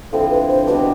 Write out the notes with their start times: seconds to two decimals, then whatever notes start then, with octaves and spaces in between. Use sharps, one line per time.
0.13 D3 F3 C4 E4 A4
0.30 B4
0.49 C5
0.67 B2 G3 D4 B4